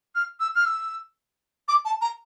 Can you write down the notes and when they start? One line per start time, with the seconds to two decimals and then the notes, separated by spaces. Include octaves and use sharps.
0.15 F6
0.40 E6
0.55 F6
0.65 E6
1.68 D6
1.85 A5
2.01 A#5